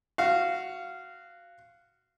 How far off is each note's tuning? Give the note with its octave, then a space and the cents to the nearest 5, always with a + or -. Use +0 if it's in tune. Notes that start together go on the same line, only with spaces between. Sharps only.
F#4 +0 F5 -15